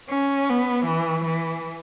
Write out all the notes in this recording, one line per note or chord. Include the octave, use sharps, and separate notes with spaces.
C#4
B3
E3
E3